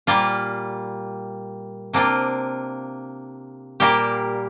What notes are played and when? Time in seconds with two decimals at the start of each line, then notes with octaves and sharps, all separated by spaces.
0.07 A#2 G3 A#3 F4
1.93 C3 A#3 D4 F4
3.80 A#2 G3 A#3 G4